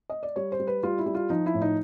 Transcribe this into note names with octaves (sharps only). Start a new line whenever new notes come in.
D#5
D5
G3 C#5
C5
G3
B4
G3 F4
E4
G3
F4
F3 D#4
E4
A2
D#4